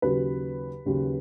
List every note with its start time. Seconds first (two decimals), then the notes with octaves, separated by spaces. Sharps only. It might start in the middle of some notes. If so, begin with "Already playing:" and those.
0.02 D#2 C#3 F#3 B4
0.85 D#2 C#3 F#3